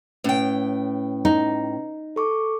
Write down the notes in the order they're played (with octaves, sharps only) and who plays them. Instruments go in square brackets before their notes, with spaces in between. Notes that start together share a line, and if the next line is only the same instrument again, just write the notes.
[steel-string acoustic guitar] A2 G5 [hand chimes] C#4 B4
[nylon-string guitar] D#4
[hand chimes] A4 C#6 D6